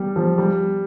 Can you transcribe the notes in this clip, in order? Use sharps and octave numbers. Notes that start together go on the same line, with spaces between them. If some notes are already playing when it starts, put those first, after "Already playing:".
Already playing: G3
F3
G3